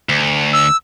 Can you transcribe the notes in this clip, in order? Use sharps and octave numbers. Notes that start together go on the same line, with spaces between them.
D2
E6